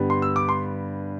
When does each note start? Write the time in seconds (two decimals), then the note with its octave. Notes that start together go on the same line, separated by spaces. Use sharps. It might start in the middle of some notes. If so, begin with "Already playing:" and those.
Already playing: G2 D3 G3 B3
0.10 C6
0.22 E6
0.36 D6
0.49 C6